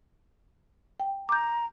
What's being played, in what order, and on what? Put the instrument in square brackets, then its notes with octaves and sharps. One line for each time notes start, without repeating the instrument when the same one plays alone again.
[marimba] G5
[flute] A#5 [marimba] D6 G6